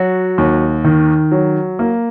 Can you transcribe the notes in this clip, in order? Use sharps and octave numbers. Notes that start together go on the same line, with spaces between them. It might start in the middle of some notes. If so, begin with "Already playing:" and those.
Already playing: F#3 F#4
D#2
D#3
F#3
A#3